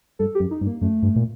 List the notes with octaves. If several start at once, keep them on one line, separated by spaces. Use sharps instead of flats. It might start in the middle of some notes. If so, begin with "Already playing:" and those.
G2 A4
G4
F#2
D#4
G2
A#3
F#2 A3
G2
A#2